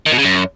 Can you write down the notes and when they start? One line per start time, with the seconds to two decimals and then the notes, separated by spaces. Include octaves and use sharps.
0.06 D#3
0.12 B2
0.18 C#3
0.24 F#2